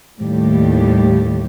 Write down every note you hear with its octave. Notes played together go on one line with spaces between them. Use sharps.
D#2 A2 G3 G4